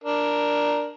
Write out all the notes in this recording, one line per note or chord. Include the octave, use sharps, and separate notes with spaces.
D4 A#4